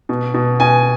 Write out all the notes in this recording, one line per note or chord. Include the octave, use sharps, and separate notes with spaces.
B2
B2
B2 G#5